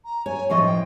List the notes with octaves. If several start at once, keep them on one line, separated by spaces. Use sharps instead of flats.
A#5
C#5 G#5
A2 F3 D#5 C#6
G5